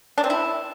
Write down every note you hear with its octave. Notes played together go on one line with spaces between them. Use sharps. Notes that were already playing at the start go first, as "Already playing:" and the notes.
D4
C4
E4